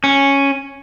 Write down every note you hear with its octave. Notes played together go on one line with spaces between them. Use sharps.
C#4